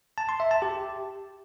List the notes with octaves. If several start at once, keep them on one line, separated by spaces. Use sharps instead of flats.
A5
C6
E5
A5
G4